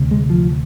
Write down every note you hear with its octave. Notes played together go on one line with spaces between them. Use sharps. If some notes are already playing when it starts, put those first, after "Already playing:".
Already playing: D2 C3
G#3
F3